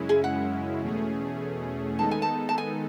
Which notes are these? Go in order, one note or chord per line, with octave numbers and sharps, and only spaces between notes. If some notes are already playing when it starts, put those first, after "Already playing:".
Already playing: F#2 C#3 G#3 C#4 E4
G#4
F#5
E2 B2 A3 C#4 G#4
D#3 G#3 B3 D#4 A4 A5
G#5
A5
A5
G#5